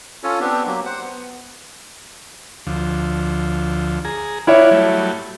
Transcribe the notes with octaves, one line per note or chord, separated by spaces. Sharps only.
C#4 F4 A4 C#5
B3 C4 D4 G4
F#3 A#3 G4
C5 F#5
B3
D2 F3
G#4 A#5
E4 F4 C#5 D5 E5 F#5
F#3 G3 A3